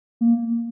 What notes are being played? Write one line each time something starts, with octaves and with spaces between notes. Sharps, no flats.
A#3